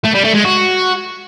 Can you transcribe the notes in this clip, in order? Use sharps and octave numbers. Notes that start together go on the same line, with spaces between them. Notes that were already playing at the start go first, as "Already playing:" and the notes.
A3
G3
A3
G#3
F#4